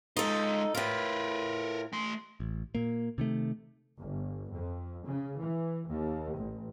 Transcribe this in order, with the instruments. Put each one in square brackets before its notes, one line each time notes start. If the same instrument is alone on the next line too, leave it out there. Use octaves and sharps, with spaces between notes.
[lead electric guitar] G#3 F4 [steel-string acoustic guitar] D#4 A4
[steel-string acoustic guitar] A2 F4 [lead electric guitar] A#4 B4
[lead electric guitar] A3 C6
[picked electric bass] A1
A#2 A#3
C3 D#3 A3
[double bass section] G1
F2
C#3
E3
D#2
A1